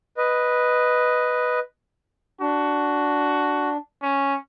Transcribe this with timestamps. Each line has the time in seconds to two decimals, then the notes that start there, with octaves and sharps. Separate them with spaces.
0.17 B4 D#5
2.41 D4 F#4
4.02 C#4